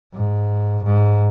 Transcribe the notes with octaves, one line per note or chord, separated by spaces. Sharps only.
G#2
G#2